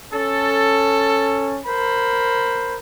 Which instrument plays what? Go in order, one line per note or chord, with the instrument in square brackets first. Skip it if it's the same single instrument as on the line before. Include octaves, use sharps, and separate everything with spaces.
[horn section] C#4 A4
A#4 C5 B5